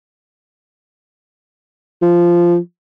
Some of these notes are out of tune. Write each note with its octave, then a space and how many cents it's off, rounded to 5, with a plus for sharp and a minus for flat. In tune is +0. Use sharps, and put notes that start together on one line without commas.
F3 -10